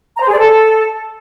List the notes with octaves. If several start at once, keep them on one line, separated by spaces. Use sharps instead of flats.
A#5
C5
G#4
D5
A4